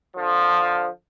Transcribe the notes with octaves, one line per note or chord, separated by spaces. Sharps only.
D3 F3